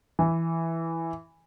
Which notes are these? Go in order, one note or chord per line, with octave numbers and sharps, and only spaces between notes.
E3